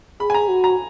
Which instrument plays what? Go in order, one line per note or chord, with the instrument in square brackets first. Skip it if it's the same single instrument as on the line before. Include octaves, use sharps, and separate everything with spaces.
[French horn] G#4 [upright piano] B5
[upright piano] G#5
A#5
[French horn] F#4
[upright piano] A#5